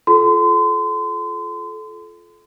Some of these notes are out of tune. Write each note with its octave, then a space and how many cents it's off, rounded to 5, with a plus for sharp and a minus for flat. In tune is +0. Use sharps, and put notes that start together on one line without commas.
F4 -5 A4 -30 C6 -35